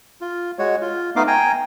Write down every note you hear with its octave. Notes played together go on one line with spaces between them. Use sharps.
F4
G#3 F#4 C#5
F4
A3 B3 D#4 D#5 F5 D6
G5 G#5 A#5